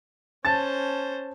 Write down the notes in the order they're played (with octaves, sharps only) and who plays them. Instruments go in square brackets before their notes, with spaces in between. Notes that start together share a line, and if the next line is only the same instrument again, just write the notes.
[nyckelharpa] C#4 C5 [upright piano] A5 A6